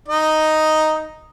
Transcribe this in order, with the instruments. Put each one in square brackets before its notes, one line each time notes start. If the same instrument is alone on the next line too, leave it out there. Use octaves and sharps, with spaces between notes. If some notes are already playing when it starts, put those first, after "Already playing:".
[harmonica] D#4 D#5